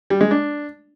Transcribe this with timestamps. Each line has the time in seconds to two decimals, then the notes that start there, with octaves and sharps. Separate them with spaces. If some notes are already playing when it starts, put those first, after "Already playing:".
0.10 G3
0.21 G#3
0.31 D4